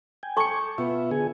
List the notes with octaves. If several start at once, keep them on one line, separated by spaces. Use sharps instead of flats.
G5 G#5
A4 A5 C#6 D6 C#7
B2 B3 F4 E5
D3 G#4 G#5